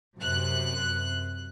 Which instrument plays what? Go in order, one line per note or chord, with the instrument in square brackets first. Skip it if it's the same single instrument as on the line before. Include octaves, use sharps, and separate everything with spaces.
[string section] F#2 C3 F#6